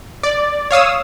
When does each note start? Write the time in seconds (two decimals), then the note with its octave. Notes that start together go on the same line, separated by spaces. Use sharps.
0.23 D5
0.71 C#5 F5 D#6 E6